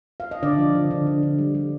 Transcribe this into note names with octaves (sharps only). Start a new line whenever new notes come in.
F5
D#5
D3 D4 D5
F3
D3
D3
D3
D3
G3
G3